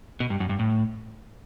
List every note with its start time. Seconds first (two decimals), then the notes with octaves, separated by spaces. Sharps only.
0.20 B2
0.30 G2
0.40 F#2
0.49 G2
0.59 A2